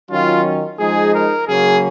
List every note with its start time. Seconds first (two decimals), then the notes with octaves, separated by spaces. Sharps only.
0.11 D#3 F#3 C#4 F4
0.80 F3 G#3 D#4 G#4
1.14 A#4
1.48 C#3 F#3 A#3 C#4 G#4